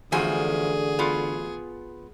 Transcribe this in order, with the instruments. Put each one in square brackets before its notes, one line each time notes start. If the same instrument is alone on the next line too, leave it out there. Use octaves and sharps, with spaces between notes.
[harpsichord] A1 F#4 [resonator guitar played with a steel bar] E2 F3 G#5 [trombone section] D3 [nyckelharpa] G#4
[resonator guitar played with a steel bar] B3 F4